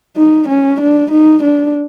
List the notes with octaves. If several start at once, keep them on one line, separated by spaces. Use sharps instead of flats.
D#4
C#4
D4
D#4
D4